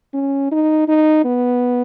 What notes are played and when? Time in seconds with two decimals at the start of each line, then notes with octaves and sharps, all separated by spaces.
0.14 C#4
0.51 D#4
0.88 D#4
1.24 B3